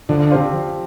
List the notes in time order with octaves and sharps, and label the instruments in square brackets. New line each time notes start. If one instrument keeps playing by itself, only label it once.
[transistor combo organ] D3 [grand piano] F3
[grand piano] C4 G4 C5 F5
F3